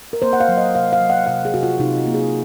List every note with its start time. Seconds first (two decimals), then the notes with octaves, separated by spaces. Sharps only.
0.13 A#4
0.22 A#3 C5
0.33 F#5
0.40 F5
0.49 F#3
0.58 D#5
0.75 C3 F5
0.93 F5
1.01 F#3
1.10 F#5
1.27 C3 F5
1.45 G#4
1.54 C3 F#4
1.63 F4
1.79 C3 D#4
1.97 F4
2.06 A#3
2.14 G#4